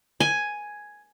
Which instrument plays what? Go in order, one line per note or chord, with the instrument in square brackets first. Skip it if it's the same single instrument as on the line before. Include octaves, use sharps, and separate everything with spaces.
[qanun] G#5